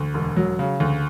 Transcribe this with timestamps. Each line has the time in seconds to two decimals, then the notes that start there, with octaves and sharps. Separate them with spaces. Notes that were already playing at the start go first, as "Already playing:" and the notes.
Already playing: D2
0.14 E1
0.37 F#3
0.59 C#3
0.80 D2